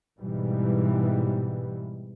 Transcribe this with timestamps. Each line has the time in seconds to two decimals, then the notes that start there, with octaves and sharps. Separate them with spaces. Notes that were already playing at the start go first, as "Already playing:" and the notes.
0.18 G#2 B2 E3 G3